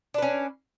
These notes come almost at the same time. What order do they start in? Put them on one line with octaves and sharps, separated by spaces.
D4 B4 C#4